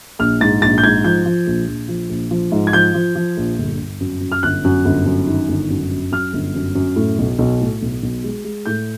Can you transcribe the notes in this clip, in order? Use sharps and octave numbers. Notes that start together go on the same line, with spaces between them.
A#1 F6
G#2 A6
A#1 A6
G6
G#2 G#6
F3 G6
F3
A#1
A#1
F3
A#1
F3
G#2
G#6
F3 G6
F3
F3
A#1
G1
G1
F#2
F#2
F6
G1 F#6
F#2
G1
F#2
D#3
G1
F#2
F#2
F#2 F6
G1
F#2
F#2
A2
B1
B1
A2
B1
B1
G#3
G#3
A2 G6